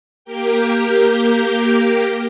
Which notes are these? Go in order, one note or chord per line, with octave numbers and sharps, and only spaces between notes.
A#3 G4 A#4 G5